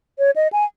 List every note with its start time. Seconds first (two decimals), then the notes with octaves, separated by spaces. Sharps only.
0.19 C#5
0.36 D#5
0.53 G#5